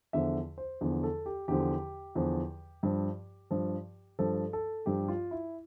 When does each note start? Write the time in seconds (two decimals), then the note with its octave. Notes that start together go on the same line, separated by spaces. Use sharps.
0.13 E2 D3 F3 E5
0.58 C5
0.81 E2 D3 F3
1.03 A4
1.26 G4
1.48 E2 D3 F3 G4
2.15 E2 D3 F3
2.83 G2 F3
3.51 G2 F3
4.19 G2 F3 A4
4.53 A4
4.86 G2 F3 G4
5.08 F4
5.31 E4